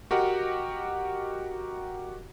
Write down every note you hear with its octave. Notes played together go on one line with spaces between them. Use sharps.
F#4 G4 A#4 D#5 F#5